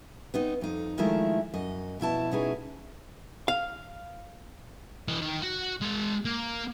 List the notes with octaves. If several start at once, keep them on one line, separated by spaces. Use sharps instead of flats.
B3 C4 D#4
F2 D#4
D#3 F3 G#3 A3 E4 A#4
F#2 D#5
F2 B2 E4 A5
B2 C#4 D#4 E4 G#4
F5
E3 D#5
D#3
F#4
G#3 A5
A#3